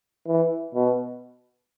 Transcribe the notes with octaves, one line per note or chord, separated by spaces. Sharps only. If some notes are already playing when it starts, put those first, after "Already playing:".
E3
B2